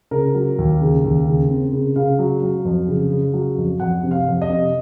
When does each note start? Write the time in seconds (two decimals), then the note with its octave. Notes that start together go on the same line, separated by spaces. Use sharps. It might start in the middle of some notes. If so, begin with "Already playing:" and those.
0.11 C#3 A#4
0.35 F#3
0.58 D#2
0.81 C#3
1.04 D#2
1.28 C#3
1.50 C4
1.73 C#3
1.96 C#3 F5
2.19 F#3
2.42 F#3
2.65 F2
2.88 C#3
3.12 C#3
3.34 F#3
3.57 F2
3.80 F2 F#5
4.03 C3
4.11 F5
4.27 F2
4.42 D#5
4.49 C3